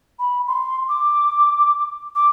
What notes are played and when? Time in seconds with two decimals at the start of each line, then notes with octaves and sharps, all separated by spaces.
0.19 B5
0.47 C6
0.88 D6
2.15 D6